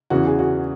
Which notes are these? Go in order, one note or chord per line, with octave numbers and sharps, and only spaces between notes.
E2 C#3 E3 F#4
G#4
F#4